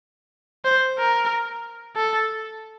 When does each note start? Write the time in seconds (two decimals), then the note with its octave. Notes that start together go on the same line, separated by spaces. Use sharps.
0.65 C5
0.98 A#4
1.96 A4